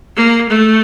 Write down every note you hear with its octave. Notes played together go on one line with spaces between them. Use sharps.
A#3
A3